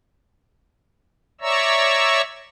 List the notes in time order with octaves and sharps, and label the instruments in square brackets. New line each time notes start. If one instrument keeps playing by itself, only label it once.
[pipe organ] C#5 D5 E5 A#5 C#6 E6